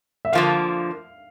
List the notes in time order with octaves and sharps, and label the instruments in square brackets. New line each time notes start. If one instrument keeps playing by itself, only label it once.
[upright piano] E5
[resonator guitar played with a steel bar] D3 F3 A#3 [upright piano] F5